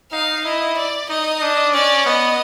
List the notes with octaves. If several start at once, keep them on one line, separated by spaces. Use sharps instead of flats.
D#4 F5
E4 D#5
D5
D#4 D#5
D4
C#4 D5
B3 D#5